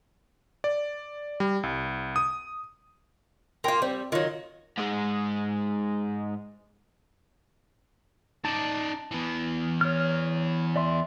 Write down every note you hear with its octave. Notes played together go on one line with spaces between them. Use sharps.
D5
G3
C2
D#6
A#3 F4 G5 C6
G3 C4
D#3 F#3 F4
G#2 G#3
D#4 D5 A5
E3 B3
C#5 F6
D5 E5 C6